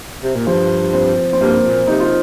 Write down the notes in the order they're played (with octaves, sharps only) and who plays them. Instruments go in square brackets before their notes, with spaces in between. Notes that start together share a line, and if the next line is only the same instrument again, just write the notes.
[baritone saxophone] C3
A#2
[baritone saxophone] G2 [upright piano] F3
[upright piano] C4
C4
[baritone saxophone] G2 [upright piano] A#3
[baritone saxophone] A#2
[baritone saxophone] C3 [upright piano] D#4
[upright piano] F4